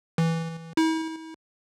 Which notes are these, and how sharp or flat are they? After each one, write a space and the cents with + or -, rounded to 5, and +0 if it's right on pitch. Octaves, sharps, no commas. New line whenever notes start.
E3 -5
E4 -45